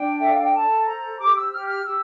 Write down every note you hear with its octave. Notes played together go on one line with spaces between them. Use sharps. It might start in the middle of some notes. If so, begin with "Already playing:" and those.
Already playing: D4 G5
A4 E5
F5
G5
A4 A5
C5 A#5
G4 D6
E6
G4 F6
F6
G4 E6